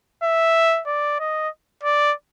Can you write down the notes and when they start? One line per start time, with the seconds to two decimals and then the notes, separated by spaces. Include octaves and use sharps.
0.24 E5
0.87 D5
1.20 D#5
1.84 D5